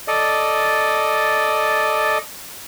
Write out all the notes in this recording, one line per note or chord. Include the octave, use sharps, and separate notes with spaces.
A4 D5 D#5